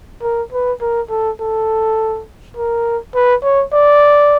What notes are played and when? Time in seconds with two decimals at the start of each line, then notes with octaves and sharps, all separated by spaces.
0.22 A#4
0.53 B4
0.81 A#4
1.10 A4
1.40 A4
2.57 A#4
3.15 B4
3.43 C#5
3.73 D5